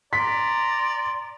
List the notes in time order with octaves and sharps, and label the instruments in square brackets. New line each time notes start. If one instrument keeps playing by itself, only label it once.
[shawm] D5 [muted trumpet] A#5 [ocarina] C6 [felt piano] B6